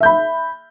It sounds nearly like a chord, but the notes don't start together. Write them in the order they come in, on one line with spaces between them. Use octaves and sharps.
E5 G6 B5